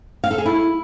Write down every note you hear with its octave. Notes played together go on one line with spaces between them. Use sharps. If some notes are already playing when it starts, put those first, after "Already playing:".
F5
A4
G#4
E4